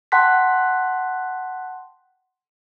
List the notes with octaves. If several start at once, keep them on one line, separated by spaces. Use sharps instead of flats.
F#5 G5 A5 C6 F#6 B6